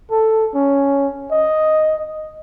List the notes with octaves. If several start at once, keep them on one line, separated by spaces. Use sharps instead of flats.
A4
C#4
D#5